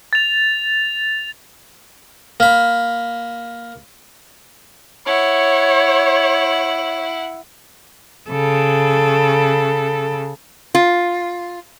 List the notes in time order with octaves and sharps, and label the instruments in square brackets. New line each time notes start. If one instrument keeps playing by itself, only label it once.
[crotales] A6 F7
[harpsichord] A#3 B5
[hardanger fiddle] E4 F#5 [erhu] C#5
[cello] C#3 A4
[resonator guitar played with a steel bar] F4